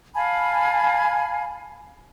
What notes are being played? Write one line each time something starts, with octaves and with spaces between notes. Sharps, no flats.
F5 G#5 A5 B5